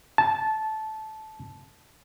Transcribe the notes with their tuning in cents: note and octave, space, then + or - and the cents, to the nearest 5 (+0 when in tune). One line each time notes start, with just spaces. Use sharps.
A5 -15